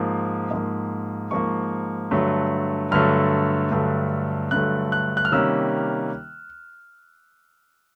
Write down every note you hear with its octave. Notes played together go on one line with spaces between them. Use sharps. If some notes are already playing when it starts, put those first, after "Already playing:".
Already playing: G#2 F3 A#3
G#2 F3 A#3
G#2 F3 A#3 C#6
G2 D3 F#3 A3
G2 D3 F#3 A3 F6
G2 D3 F#3 A3
G2 D3 F#3 A3 F#6
F#6
F#6
F6
C3 D#3 G3 A#3 C#4 E6